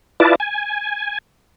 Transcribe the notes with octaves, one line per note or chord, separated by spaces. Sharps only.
E4 F4 B4 D5 A5
G#5